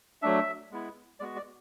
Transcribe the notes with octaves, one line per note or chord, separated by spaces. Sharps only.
F#3 A3 D4 E5
G#3 B3 E4
G#3 B3 F#4 D5
D5